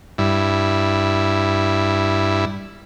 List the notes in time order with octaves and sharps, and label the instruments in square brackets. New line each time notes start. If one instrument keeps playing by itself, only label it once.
[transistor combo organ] G2 E4